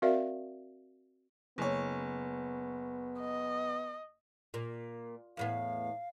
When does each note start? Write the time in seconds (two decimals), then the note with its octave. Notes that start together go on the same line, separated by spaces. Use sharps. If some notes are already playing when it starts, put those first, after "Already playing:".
0.02 C4 F#4 A#4 D5 E5 F5
1.58 F#1 B3 C#5
3.20 D#5
4.54 A#2
5.37 E2 A2 B3 F5